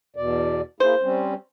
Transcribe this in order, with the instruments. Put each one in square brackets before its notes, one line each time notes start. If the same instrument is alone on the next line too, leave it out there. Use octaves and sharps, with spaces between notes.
[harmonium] E2 B2 D5
[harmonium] A#3 E4 G#4 [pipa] C5
[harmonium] G3 C4 C#4